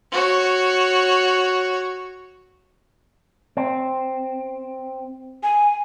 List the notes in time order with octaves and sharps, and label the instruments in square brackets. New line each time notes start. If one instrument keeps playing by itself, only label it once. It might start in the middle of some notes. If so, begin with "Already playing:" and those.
[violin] F#4 C#5
[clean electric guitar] C4
[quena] G#5